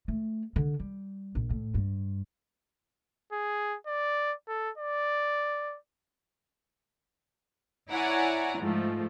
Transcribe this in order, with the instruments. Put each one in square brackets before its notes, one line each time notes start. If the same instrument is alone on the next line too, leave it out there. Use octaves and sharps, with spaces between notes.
[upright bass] A3
D3
G3
A#1
A2
G2
[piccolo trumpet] G#4
D5
A4
D5
[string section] E4 C#5 D5 F#5 G#5 A#5
G#2 F3 A3